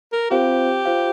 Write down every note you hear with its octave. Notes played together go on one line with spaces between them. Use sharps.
A#4
C4 F4 G4 C5 F5
F4 C5 F5